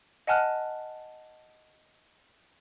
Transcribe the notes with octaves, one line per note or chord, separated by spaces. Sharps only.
D#5 F#5 G#5 A5 F6 F#6